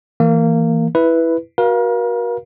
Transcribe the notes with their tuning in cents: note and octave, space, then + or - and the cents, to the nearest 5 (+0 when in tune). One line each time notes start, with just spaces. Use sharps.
E3 +0 A#3 -20
E4 +0 B4 +0
F#4 +0 A#4 +40 F5 +0